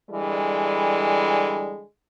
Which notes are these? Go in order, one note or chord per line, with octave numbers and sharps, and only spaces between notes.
D3 E3 G3 G#3